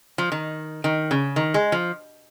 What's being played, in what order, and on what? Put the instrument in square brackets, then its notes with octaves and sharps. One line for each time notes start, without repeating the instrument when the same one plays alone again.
[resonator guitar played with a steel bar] F3
D#3
D#3
C#3
D#3
G#3
F3